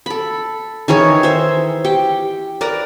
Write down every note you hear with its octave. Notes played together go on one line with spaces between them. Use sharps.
A4 B5
D#3 E3 G#4 C#5
C5 E5
G4 G5
A#4 B4 D5 A#5